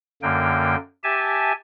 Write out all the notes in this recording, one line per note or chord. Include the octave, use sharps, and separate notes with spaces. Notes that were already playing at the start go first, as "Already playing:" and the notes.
F#2 D3 A#3 G5
G4 E5 G#5 A5